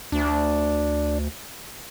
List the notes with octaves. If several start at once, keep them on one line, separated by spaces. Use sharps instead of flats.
D2 D4